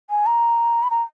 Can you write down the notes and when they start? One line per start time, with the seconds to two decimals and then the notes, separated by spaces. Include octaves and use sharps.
0.10 G#5
0.26 A#5
0.83 B5
0.90 A#5